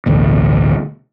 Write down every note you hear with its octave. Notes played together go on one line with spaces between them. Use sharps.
A1 D2 B2